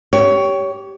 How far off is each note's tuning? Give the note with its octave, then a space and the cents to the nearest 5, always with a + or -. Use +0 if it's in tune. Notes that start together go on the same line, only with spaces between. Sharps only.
G4 -10 C#5 +20